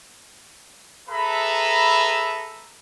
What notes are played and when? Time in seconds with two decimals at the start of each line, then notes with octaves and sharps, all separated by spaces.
1.09 G#4 A4 B4 E5 A#5 B5